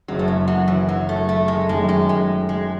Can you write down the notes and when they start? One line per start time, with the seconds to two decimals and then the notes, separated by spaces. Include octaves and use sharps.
0.08 F#1 F#2 C#3 F#3
0.19 A3
0.28 G#3
0.48 F#3
0.68 E3
0.89 F#3
1.09 A3
1.29 A3
1.48 G#3
1.69 F#2 D#3 F#3 G#3 A3
1.89 G#3
2.09 G#3
2.49 G#3